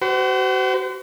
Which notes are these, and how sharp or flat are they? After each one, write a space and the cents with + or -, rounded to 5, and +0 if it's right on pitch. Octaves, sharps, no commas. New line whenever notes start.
F#4 +35 C5 -35